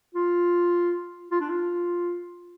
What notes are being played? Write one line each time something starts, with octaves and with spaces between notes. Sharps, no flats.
F4
F4
D4
F4